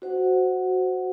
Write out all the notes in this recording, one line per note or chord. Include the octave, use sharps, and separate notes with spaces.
F#4 C5 F#5